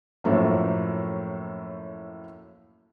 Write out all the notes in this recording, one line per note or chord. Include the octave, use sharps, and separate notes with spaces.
F#2 A2 F3 F#3 A3 A#3